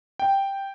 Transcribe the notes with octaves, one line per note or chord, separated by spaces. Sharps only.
G5